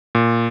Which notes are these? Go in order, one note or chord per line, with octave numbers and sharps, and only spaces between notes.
A#2